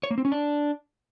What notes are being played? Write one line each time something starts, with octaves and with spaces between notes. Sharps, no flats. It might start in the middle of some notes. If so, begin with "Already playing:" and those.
C#5
A#3
C4
C#4
D4